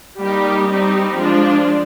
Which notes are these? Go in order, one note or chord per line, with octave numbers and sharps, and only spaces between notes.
G3 A#3 D#4 G4
G3 C4 D#4 G4
F3 G#3 D4 F4